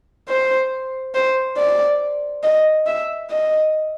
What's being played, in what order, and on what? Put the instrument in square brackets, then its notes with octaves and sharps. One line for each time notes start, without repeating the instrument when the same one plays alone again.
[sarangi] C5
C5
D5
D#5
E5
D#5